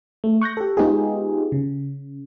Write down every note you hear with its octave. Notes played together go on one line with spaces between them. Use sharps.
A3
C#6 F#6 G6 A#6
G4 A4
G#3 B3 D#4 F4 G4 G#4
C#3